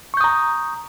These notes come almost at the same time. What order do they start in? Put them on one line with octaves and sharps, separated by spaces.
C#6 G6 D#6 A#5